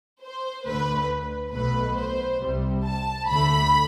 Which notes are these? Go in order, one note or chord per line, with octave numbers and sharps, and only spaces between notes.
C5
D2 D3 A3 B4
B1 B2 A3 B4
C5
C2 C3 G3
A5
D2 D3 A3 B5